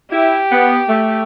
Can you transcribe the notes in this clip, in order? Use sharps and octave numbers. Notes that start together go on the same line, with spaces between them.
E4 G4
B3
A3